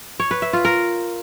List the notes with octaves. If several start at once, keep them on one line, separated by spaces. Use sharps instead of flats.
C#5
B4
E5
F4
A#4